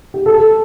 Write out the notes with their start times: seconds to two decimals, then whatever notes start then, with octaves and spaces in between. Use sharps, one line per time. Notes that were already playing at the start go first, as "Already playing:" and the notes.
0.14 G4
0.26 A4